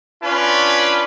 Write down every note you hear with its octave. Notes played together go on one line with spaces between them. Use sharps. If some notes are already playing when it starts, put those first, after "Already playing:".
C#4 D4 F4 B4 G#5 B5